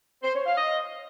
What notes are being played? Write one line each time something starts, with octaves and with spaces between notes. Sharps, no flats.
C5
C#5
F5
D#5